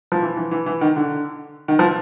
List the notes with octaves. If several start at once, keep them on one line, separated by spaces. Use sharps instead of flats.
F3
E3
E3
E3
E3
D#3
D3
D#3
F3